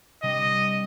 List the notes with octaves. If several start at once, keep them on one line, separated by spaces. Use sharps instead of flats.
C3 G3 D4 D#5